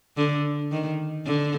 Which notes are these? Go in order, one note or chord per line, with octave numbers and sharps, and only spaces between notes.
D3
D#3
D3